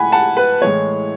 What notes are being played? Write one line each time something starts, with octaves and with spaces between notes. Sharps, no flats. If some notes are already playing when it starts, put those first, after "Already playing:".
Already playing: A2 G#3 F#5 G#5 B5
F#5 A5
B4
A2 E3 G#3 C#5